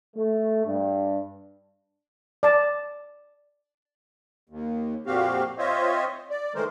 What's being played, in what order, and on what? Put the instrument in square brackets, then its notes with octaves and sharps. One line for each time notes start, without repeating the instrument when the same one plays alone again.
[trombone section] A3
G2
[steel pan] D5 A5
[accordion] D#2
F2 A#2 C4 F#4 G4 F5
C4 F4 C5 C#5 D#5 E5
D5
D#3 E3 G#3 A3 A#4 C5